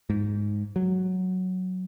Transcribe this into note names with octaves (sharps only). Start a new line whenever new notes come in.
G#2
F#3